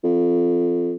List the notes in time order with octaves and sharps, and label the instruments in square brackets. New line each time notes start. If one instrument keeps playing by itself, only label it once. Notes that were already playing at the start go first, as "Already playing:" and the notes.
[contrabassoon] F2